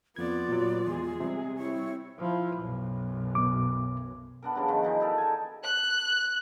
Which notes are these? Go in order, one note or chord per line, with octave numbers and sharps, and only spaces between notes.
F2 B3 F4 D5 G#6
A#2 F#3
E2 G#3 G#4
C3 G3
C4 E4 C#5
F3 E4
B1 F#2
B2 D6
B3 D4 A#4
G2 C#3 F3
D#3 F3
B2 E3 D#4
D#4 A4 A#4 D5
G#5 A5
F#6